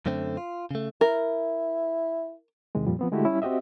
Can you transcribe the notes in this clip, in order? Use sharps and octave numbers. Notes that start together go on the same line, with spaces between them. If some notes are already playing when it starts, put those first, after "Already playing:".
F#2 D3 A3 C4
F4
C#3 A3
E4 A#4
E2 C3 D#3 G#3
F2 A#2 F3 G3
F3 B3 C4
D3 G#3 A3 E4 F#4 G4
G3 C#4 E4
C4 F#4 G4 D#5 E5